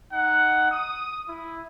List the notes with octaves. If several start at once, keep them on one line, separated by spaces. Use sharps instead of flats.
D#4 F#5
D#6
E4